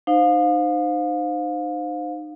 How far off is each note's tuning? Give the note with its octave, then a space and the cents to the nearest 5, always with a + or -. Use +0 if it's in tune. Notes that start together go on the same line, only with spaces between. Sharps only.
D#4 -35 C5 -10 F5 +25